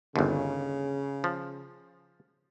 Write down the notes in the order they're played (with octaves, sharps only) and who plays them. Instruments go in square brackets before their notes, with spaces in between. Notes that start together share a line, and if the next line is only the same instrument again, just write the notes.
[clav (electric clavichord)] G1 D#2 [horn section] C#3
[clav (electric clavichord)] F3